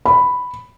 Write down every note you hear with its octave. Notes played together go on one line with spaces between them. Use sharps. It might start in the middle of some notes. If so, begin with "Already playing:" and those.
B5